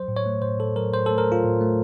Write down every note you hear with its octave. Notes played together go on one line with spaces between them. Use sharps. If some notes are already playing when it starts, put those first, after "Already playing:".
Already playing: F#3 C5
A2
C#5
A3
A2 C5
A2 A4
F#3 A#4
A2 C5
A4
A3
A#4
A3
F4
A2
A3